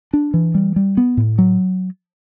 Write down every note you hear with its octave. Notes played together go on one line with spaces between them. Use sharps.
D4
E3
G3
G3
B3
A2
F#3